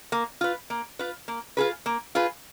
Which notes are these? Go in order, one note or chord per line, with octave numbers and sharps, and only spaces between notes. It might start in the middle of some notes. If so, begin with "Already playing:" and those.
A#3
F4 B4
A#3
F4 B4
A#3
F4 G#4 B4
A#3
F4 G#4 B4